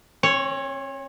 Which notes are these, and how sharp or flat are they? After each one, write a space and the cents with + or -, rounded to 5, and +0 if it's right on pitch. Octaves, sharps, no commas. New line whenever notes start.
C4 +45 C#5 +0